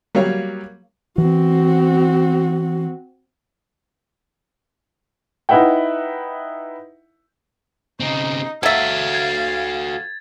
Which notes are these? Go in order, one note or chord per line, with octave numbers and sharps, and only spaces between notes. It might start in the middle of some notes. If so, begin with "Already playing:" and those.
F#3 G3 A#3 C#5 F5
E3 C4 F#4
D#4 E4 B4 E5 F#5 G5
C#3 C4 D#4
F#3 F#4 A4 E5 F5 G#6 A6
G#6